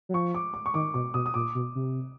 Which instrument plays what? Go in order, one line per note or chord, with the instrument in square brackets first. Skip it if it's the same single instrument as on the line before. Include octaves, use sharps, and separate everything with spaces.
[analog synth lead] F#3
[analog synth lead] F3 [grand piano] C#6
[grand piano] D6
D6
C#6
[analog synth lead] D#3 [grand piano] D6
[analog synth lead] B2 [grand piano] D6
[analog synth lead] B2 [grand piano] D#6
[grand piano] D#6
[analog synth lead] A#2 [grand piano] D6
[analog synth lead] B2
C3